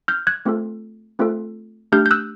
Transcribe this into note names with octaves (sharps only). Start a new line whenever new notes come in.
F6 G6
F#6 G#6
A3 C4 F4 A4
A3 C4 F4 A4
A3 D4 G4 F6 G6
G6
E6 F#6